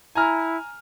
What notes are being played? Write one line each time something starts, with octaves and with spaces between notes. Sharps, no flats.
E4 G#5 A#5 F6